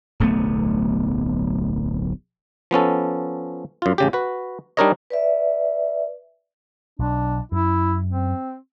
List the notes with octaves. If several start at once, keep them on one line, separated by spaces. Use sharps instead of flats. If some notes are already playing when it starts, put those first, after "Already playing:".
D1 B1 A3 B3
F3 B3 C#4 A4
F#2 F4
A1 C#3 G4
F#4 B4
G3 D4 D#4 A#4 C#5 D#5
B4 D5 E5
B1 D4
F#2 E4
C4